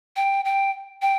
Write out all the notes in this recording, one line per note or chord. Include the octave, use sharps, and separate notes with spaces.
G5
G5
G5